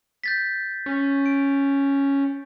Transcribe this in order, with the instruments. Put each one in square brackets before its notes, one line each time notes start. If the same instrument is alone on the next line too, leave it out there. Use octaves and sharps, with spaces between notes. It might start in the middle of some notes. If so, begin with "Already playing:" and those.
[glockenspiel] G6 A6 B6
[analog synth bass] C#4
[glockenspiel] D7